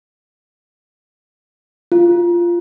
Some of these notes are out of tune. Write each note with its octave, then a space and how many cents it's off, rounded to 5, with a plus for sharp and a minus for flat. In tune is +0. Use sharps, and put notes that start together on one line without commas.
F4 -10